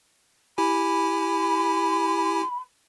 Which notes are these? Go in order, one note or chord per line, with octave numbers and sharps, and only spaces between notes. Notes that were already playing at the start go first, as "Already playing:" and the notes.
E4 G4 G#5 B5